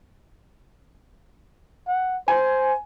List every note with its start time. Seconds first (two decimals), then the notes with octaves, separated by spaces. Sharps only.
1.88 F#5
2.28 C5 G#5